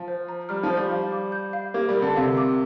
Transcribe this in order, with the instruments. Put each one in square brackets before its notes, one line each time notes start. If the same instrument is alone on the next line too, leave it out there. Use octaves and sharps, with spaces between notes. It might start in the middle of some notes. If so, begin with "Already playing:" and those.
Already playing: [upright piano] F3
[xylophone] C5
A#5
[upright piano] G3 [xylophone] F6
[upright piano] F3
[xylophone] C5
[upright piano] G3
[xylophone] F5
D6
G6
F5
[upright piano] A#3 [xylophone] G4
[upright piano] G3
[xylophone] A#4
[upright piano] D3
[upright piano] C3 [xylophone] F5
[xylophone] D6